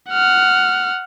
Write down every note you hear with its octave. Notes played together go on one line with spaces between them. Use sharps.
F#5 F6